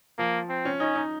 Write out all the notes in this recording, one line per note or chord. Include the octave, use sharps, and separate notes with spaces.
F3 A#3
C4
C#4
C#4 D#4
D#4